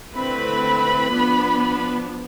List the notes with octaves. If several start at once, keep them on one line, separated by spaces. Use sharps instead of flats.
D3 A3 C4 E4 B4 B5
F3 B3 D4